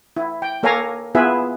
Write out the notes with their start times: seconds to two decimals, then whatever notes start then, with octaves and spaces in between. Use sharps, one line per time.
0.17 E4
0.42 G5
0.63 A#3 A4 C#5 F5 G#5 A#5
1.15 B3 E4 F4 G#4 B4 E5